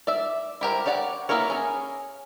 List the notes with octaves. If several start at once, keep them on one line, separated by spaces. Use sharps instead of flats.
D5 E5
E4 G4 A#4 C5
G4 C#5 D5 F#5
A#3 B3 E4 A#4 C#5
C#4 G#4